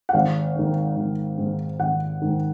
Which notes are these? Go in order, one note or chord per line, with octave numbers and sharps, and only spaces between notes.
F#5
G#1 F5
G#2 D#3
G#1
G#2 D#3
G#1 F#5
G#2 D#3